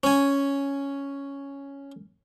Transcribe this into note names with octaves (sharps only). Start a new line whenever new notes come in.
C#4 G#5